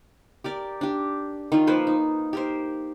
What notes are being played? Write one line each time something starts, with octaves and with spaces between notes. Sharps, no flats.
G4 A#4 D5
D4 G4
D#3 F4
F3 A#3 B4 C5
D#4
G4 A#4 C5